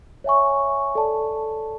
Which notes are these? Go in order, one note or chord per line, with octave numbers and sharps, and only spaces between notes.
C#5 E5 G#5 C#6
A4 D5 A5